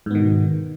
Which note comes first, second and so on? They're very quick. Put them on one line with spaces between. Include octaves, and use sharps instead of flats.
G#2 B3 D#3 B2